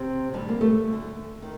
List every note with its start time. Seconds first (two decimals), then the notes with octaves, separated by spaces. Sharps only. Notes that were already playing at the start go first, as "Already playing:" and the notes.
Already playing: C3 C4
0.33 D2 D3 G3
0.49 A#3
0.61 A3
0.87 D2 D3
1.42 D#3